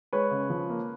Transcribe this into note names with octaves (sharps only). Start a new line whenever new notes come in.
G#3 B4 C#5
C#3
F3
A#3